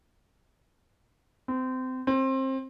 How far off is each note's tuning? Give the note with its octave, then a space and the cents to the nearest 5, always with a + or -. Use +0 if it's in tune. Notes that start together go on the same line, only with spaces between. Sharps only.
C4 -25
C4 +25